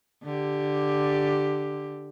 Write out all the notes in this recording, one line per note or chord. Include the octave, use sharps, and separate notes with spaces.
D3 G4